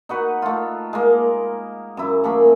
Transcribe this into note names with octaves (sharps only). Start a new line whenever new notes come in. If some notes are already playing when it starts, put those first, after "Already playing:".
D#4 F#4 B4 F#5
A3 F4
G#3 A#3
F#2 E4
A3 A#3 G#4 B5